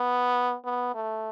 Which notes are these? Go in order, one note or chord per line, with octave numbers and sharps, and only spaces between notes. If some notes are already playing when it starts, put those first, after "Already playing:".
Already playing: B3
B3
A3